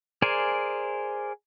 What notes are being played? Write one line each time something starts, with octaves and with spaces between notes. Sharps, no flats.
G#4 A#4 C5 D5 G#5